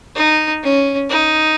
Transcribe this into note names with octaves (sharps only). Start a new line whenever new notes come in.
D#4
C#4
D#4